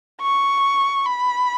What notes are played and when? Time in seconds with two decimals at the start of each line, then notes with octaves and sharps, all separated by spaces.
0.21 C#6
1.05 B5